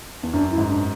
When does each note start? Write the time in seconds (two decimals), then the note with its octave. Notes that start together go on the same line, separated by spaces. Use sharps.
0.23 E2
0.33 F#2 D4
0.51 E4
0.58 G#2
0.69 D4